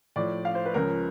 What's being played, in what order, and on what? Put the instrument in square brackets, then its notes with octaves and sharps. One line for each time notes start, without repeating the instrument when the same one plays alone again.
[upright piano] A2 F3 D5
F5
C5
B4
C#2 C#3 F3 A#4